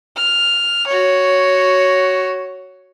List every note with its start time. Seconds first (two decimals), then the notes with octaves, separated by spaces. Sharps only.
0.17 F6
0.87 F#4 C#5